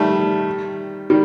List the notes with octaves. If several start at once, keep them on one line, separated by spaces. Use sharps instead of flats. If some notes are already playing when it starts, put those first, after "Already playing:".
Already playing: D#3 G3 A3
D#3 G3